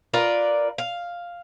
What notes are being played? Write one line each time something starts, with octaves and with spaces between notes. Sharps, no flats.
F4 A#4 B4 D5
F5